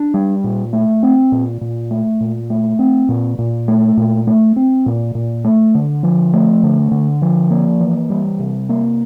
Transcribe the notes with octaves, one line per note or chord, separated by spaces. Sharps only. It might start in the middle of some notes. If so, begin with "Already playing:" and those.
Already playing: D4
G3
A#2
A3
C4
A#2
A#2
A3
A#2
A3
C4
A#2
A#2
A3
A#2
A3
C4
A#2
A#2
A3
D3
F3
A3
D3
D3
F3
A#3
E3
G3
C3
A#3